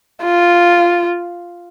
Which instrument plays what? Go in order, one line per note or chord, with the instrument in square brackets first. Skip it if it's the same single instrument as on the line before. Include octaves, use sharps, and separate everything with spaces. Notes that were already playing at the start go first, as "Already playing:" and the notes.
[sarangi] F4